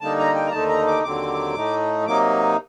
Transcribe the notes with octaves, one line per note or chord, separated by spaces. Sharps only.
D3 G3 A#3 D#4 A5
A#5
G5
A#5
D#2 D3 A3 D#4 A5
A#5
D6
D#2 D3 F#3 C4 D6
A2 A3 D#4
C3 F#3 A#3 D#4 D6